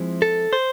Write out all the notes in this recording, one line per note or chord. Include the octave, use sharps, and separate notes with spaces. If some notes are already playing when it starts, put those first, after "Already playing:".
Already playing: F3 G#3 C4 E4
A4
C5